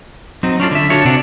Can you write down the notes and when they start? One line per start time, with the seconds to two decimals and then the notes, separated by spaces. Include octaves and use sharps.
0.43 F#3 C4 D#4
0.60 C#4 D4 F4 A4
0.71 D3 E5
0.90 D4 F4 F#4 A4 C#5
1.05 C3 D4 F#5